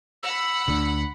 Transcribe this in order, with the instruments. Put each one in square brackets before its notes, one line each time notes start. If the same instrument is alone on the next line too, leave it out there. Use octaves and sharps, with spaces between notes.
[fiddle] F#5 B5 [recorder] E6
[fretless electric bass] D2 D3